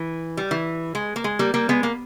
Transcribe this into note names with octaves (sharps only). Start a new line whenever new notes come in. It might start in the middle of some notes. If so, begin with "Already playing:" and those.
Already playing: E3
G3
E3
G#3
A#3
G#3
G3 A#3
G3 A#3
G#3 B3
A#3